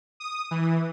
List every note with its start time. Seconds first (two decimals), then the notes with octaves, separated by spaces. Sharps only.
0.20 D#6
0.51 E3